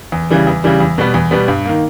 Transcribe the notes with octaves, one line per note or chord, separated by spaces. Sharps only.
E2
C#3 E3 G3
E2
C#3 E3 G3
E2
B2 G3 B3
E2
B2 G3 B3
G2
D#3 A#3